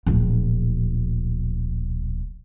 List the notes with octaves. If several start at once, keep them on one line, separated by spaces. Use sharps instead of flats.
D1 A#1